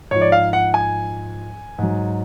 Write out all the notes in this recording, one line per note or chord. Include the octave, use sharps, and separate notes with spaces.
G#2 F3 C#5
D5
F5
F#5
G#5
G#2 F#3